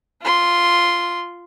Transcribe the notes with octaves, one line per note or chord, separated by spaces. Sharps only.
F4 C6